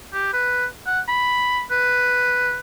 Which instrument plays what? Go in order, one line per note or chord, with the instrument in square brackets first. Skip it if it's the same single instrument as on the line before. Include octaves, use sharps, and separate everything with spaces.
[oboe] G4
B4
F#5
B5
B4